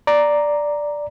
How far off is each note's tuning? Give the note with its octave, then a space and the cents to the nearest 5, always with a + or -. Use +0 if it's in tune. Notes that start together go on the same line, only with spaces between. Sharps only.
D5 +0 A#5 +0